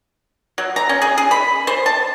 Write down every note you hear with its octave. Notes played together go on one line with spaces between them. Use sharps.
F#3
A#5
C#4
G#4
G#4
B5
C5
A5